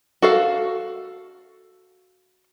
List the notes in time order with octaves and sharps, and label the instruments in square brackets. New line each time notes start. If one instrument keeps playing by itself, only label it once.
[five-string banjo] F#4 A4 F5